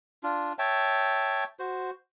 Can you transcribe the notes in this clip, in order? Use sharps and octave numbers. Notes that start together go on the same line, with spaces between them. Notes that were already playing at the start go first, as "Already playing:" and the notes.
D4 F4
C#5 E5 G5 A5
F#4 C5